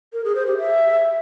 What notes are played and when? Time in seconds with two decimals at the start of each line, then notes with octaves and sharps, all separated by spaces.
0.13 A#4
0.24 G#4
0.35 C5
0.47 G4
0.58 E5